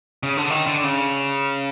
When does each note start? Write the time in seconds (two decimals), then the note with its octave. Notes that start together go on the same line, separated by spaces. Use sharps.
0.23 C#3
0.37 D3
0.50 D#3
0.67 D3
0.84 C#3